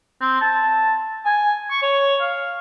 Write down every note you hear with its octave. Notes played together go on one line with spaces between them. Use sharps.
C4
A5
G#5
C#6
C#5
F5